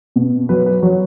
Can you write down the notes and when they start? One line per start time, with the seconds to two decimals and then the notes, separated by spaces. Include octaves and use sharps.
0.16 B2
0.49 F#3 B4
0.66 B4
0.82 F#3 C#5